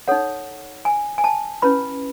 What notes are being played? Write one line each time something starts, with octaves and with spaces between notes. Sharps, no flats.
D#4 A4 C#5 F#5
G#5
G#5
A5
C#4 E4 B4 B5